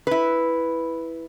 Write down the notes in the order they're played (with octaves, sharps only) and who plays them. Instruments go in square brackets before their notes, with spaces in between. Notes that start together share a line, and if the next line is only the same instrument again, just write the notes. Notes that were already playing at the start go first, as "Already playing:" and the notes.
[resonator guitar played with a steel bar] E4 B4